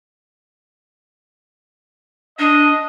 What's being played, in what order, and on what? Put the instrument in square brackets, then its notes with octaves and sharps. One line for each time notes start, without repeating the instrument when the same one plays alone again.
[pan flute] D4 [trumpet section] D#5